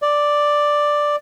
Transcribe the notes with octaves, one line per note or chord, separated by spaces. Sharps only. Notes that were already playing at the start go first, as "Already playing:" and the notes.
D5